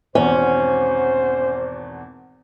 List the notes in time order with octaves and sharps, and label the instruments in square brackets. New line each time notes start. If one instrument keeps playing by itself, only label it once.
[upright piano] G#1 E2 B2 [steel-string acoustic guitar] C#4 [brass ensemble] C5